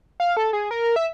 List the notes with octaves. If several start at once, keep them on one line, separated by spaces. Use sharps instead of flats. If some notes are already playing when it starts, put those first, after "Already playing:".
F5
A4
G#4
A#4
E5